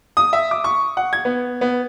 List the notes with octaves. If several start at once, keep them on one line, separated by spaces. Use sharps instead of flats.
D#6
E5
D6
C#6
F#5
G#6
B3
B3